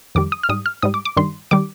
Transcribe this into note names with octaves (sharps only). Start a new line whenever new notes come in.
F2 D#3 G3 D6
D#6
F6
G#2 G3 D#6
F6
G#2 G3 D#6
D6
D6
G2 D#3 G3 C6
D#3 G3 D6